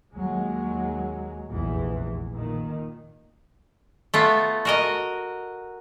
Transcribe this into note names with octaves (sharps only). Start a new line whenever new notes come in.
D#2 F#3 G#3
F1 A#1 E2 E3
A#2 D#3
A3 B3 F4
F#4 A#4 D#5